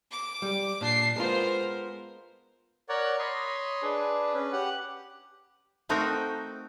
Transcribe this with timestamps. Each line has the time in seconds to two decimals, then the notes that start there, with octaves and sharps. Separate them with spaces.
0.12 D6
0.42 G3
0.81 A#2 D4 C7
1.16 G#3 B3 F4 A#4 C5
2.89 A#4 C#5 D5 F#5
3.19 C#5 D#5 B5 C6
3.82 D4 G#4 B4
4.34 C#4 B4
4.53 G4 F#5
5.89 A3 C4 D#4 F#4 A#4